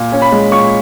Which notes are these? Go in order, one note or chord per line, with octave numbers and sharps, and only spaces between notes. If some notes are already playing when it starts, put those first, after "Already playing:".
Already playing: A#2
C#4
B5
G#3
A#2 C#6